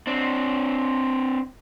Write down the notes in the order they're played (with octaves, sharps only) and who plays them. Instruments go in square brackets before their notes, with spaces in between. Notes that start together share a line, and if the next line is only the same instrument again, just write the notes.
[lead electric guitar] C4 D4